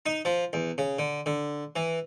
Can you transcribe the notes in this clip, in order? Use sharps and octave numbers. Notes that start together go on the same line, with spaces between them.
D#4
F3
E2
C#3
D3
D3
E3